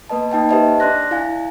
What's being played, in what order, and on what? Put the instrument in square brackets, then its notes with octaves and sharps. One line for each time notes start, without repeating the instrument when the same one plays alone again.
[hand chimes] A#3 B3 B4 D#5 A5
A#3 D#4 G5 A5
G4 B4 C5 D#5 E5 A5
D4 D5 C6 F#6 A#6
E4 F5 G#5